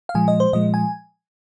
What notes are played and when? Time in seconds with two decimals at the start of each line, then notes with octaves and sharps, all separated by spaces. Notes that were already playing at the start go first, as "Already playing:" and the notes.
0.09 F5
0.15 A#2 F3 G#3 G#5
0.28 D#5
0.40 C5
0.53 A#2 F3 G#3 D#5
0.74 G#5